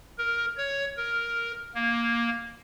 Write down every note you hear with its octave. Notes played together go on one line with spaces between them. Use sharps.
A#4
C#5
A#4
A#3